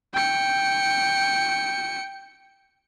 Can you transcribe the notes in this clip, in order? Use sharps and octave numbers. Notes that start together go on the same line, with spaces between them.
G5 C#7